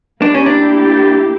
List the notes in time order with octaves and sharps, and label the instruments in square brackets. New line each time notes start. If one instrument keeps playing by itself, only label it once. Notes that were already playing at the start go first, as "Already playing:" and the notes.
[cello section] A#3 E4 G4 [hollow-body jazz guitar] D4
[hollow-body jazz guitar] C#4
D4